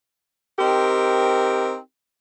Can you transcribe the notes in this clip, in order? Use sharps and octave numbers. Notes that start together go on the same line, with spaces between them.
C4 D#4 G4 A#4